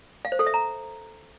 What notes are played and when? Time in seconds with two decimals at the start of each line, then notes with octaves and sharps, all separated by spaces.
0.25 F5
0.32 C5
0.39 A4
0.47 E5
0.54 A#5